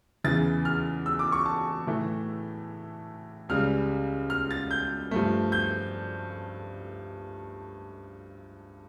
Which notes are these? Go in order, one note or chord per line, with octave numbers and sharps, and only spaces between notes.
E2 C#3 E3 A6
F6
E6
D6
C#6
A5
A2 E3 A3
C#2 C#3 G3 F6
F6
A6
G6
G2 F3 A3
G6